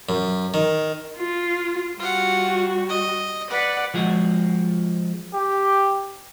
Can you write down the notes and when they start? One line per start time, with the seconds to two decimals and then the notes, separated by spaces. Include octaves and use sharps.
0.09 F#2
0.54 D#3
1.17 F4
1.99 G3 F4 F#4 F#5
2.89 D#5
3.50 B4 D5 F#5
3.94 F3 G#3 F#4
5.35 G4